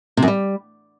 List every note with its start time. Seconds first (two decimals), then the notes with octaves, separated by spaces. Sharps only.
0.17 C3
0.23 F#2
0.28 G3